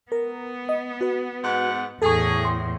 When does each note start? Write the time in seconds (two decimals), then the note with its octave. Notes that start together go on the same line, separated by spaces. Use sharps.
0.12 B3 A#4
0.69 D#5
1.01 F#4 B4
1.44 G#2 F#5
2.02 E2 A2 G#4 A4 C#6
2.45 C6